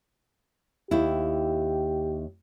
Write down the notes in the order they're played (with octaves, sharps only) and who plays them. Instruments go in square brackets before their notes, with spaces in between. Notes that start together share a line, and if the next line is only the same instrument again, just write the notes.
[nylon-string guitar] D#2 E4 [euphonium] G4